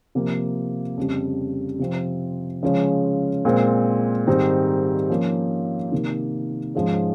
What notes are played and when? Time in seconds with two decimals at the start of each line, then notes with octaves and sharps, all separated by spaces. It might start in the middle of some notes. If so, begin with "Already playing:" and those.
0.15 C3 F3 A#3
0.97 F2 C#3 G3
1.79 C3 F3 C4
2.63 C#3 F3 G#3 C#4
3.45 A#2 G#3 C4
4.27 G#2 D#3 G3 C4 D#4
5.10 F3 A#3 C#4
5.92 C3 D#3 A#3
6.75 G#2 F3 G#3 C#4